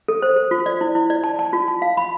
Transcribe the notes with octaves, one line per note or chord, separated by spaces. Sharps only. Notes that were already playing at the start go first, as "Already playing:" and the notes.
A4
C5
A4
F4
D5
E4
E4
D5
A5
A5
F4
A5
F5
B5